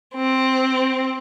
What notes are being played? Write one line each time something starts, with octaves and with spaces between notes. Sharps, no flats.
C4